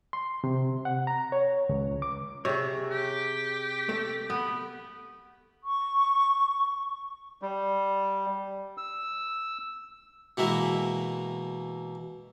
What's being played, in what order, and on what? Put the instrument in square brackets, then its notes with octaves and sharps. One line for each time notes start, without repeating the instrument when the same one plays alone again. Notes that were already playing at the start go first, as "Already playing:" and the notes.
[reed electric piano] C6
C3
F#5
A#5
C#5
C#2
D6
[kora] C3 [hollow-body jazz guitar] G#4 C#5
[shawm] G4
[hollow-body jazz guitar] A3
[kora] B3
[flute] C#6
[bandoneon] G3
E6
[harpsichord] B2 E3 G#3 A#3 E5